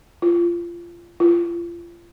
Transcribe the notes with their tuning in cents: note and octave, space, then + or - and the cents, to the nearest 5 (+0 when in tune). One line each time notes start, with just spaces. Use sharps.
F4 -25
F4 -35